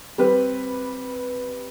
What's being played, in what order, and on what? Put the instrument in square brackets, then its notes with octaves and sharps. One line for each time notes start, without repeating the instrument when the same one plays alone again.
[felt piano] G3 C4 B4